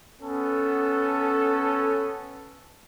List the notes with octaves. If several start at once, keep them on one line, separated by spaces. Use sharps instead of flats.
B3 C#4 A4